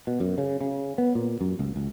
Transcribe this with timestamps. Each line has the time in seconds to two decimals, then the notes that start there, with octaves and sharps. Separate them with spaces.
0.07 B2
0.20 F#2
0.38 C#3
0.61 C#3
0.98 B3
1.15 A#2
1.41 F#2
1.59 C#2
1.76 C#2